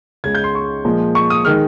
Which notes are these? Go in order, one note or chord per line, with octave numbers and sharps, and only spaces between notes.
C#2 C#3 G#3 G#6
G6
C6
C#6
A#2 F3 G#3
C#6
D#6
D#3 G#3 F6